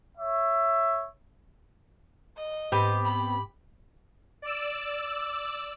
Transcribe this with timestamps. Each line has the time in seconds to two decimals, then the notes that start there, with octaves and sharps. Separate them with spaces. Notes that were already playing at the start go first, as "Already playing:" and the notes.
0.17 C#5 E5
2.37 D#5
2.72 G#2 B3 C4 G4
3.05 B5
4.42 D5 E6